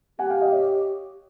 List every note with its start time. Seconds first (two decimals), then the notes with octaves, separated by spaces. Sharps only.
0.19 G4 F#5 G#5
0.30 F5 G5
0.41 D#5 F5
0.52 C#5 D#5